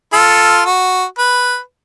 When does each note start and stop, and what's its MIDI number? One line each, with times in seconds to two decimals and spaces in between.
0.13 0.64 65
0.13 0.64 69
0.65 1.04 66
1.19 1.59 71